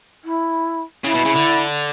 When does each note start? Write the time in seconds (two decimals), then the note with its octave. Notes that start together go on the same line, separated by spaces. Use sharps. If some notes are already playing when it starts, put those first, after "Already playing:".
0.24 E4
1.04 C#3 E4
1.14 B2
1.25 C#3
1.35 D3